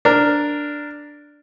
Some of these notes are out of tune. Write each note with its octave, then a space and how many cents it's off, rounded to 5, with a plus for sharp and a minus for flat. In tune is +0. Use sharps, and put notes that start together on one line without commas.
D4 +0 A#4 -5